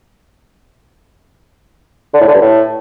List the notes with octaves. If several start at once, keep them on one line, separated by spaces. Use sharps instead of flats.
D3
A2
D3
G2
A2